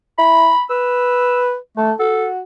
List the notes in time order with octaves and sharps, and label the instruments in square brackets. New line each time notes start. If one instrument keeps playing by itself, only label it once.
[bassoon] E4 [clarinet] B5
[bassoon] B4 [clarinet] E6
[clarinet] A3 [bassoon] A4
[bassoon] F#4 [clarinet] A4